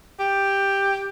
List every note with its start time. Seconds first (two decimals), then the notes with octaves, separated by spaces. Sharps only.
0.20 G4